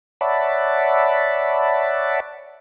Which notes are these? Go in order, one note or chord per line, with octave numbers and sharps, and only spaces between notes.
C#5 D5 E5 F#5 A5 B5